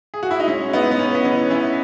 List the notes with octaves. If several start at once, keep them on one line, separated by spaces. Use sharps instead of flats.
G#4
F#4
E4
D#4
G#3 C#4
G#3 B3 D#4
B3
A2 C#4
B3
E3 C#4
E3 C#4 E4